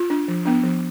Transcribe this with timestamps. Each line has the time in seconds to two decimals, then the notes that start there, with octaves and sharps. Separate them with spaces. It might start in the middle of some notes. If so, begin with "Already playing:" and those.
Already playing: F4
0.10 D4
0.28 F3
0.46 B3 D4
0.63 F3